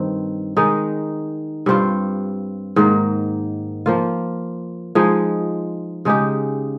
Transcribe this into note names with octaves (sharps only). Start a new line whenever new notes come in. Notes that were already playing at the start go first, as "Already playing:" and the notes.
Already playing: G2 D#3 C4
D#3 G#3 D#4
G2 G3 C4 F4
G#2 D#3 A#3
F3 A#3 F4
F3 G#3 D#4 G#4
C#3 G#3 D#4 G4